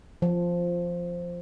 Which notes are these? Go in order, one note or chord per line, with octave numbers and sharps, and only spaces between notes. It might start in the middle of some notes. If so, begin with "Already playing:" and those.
F3